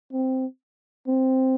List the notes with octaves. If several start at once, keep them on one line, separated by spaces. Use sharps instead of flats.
C4
C4